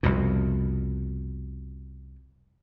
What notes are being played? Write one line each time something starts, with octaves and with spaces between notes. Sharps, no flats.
C2 F2 B2